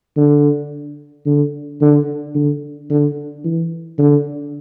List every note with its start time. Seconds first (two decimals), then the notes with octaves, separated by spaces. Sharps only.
0.17 D3
1.26 D3
1.81 D3
2.35 D3
2.90 D3
3.44 E3
3.99 D3